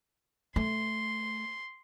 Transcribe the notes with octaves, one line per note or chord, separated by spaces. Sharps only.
A3 C6